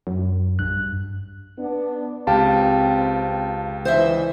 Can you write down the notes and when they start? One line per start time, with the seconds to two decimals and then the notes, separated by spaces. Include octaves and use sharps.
0.07 F#2
0.59 A#1 G2 F#6
1.59 B3 D4
2.27 C#2 C4 G4 F5 G5 A5
3.85 D3 E3 C5 D#5 E5